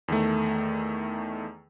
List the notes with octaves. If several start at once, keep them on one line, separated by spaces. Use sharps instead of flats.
E2 D#3 A3